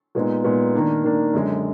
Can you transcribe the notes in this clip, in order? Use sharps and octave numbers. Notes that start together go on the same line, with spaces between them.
A#2 G#3 B3 D#4
A#2 G#3 B3 D#4
D#3 A#3 D4
D#3 A#3 D4
F#2 D3 G#3